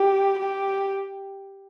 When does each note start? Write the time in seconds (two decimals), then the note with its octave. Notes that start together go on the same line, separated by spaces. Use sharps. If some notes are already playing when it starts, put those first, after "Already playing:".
Already playing: G4
0.39 G4